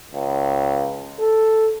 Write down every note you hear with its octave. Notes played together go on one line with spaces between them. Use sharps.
C#2
A4